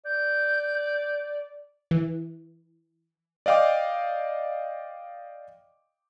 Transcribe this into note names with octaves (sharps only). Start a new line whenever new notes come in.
D5 G6
E3
D5 D#5 F5 G5 D6